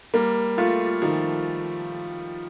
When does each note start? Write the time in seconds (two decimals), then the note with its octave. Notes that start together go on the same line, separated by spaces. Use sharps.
0.14 G3 A#3
0.58 A3 F4
1.02 D#3 F3